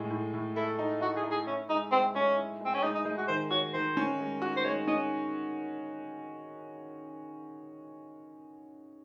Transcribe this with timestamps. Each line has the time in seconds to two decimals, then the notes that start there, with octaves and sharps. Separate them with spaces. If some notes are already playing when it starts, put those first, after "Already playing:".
Already playing: A2 G#3
0.11 A2
0.34 A2
0.56 E4 A4
0.79 D#4
1.01 D#4 F#4
1.16 G#4
1.24 D#4
1.31 G#4
1.47 C#4 E4
1.69 G#3 D#4
1.91 G#3 C4
2.15 G#3 C#4
2.37 E4
2.61 G#3 C4
2.74 C#4
2.83 G#3 D#4
2.95 D#4
3.05 G#3 D#4
3.18 F#4
3.28 D#3 C5
3.51 F#4 C#5
3.74 D#3 C5
3.97 C#4
4.20 G#3
4.42 F#4
4.57 C5
4.64 G#3 C#5
4.87 C#4 D#5